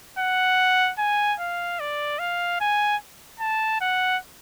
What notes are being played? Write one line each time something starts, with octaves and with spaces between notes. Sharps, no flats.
F#5
G#5
F5
D5
F5
G#5
A5
F#5